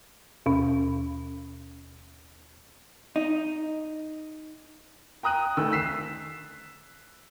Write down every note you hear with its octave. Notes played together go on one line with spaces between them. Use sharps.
D#2 B2 C#4
D#4
G5 A#5 D#6 F#6 D#7
D2 D#3 A3 E6
E6 B6 C7 E7